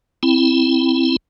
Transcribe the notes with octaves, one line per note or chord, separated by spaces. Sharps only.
C4 E4